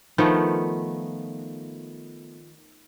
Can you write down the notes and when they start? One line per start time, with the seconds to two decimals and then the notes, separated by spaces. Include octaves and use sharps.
0.18 D#3 F3 A3 B3